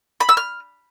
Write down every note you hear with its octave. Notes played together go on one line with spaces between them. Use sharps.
B5
E6
F6